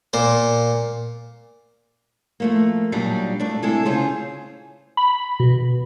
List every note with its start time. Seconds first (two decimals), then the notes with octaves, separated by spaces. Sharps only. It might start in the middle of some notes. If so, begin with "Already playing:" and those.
0.13 A#2 C5
2.40 F3 A3 A#3
2.92 A#2 F#3 G3 D4 D#4
3.40 A3 D4
3.62 C3 G#3 E4 G#4 A4
3.85 C#3 F4 G#4 C5
4.97 B5
5.40 B2